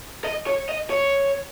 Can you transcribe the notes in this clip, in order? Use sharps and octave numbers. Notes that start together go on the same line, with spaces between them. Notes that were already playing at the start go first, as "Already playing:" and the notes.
D#5
C#5
D#5
C#5